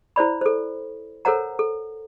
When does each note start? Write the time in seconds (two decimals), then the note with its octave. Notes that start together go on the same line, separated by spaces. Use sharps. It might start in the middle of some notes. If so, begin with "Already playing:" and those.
0.16 E4 C5 D5 B5
0.41 A4 C5
1.25 A4 A#4 C5 C#5 F#5 A#5
1.59 A4